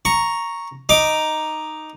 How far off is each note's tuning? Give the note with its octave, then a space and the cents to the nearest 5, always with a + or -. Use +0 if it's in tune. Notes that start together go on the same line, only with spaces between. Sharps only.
A#5 +0 C#6 +0
D#4 +0 D6 +0